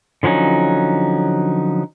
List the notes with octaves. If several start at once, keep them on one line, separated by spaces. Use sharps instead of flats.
D3 F3 F#3 C#4 D#4